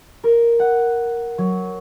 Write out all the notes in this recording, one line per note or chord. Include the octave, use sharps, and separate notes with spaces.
A#4
F#5
F#3